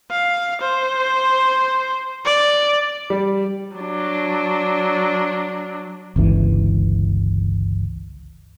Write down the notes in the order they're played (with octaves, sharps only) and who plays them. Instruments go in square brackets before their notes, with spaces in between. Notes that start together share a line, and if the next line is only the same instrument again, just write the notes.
[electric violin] F5
C5
D5
[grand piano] G3
[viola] F#3 D4
[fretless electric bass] G1 C#2 E3